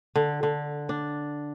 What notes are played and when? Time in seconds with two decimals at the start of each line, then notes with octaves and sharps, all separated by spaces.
0.16 D3
0.43 D3
0.89 D4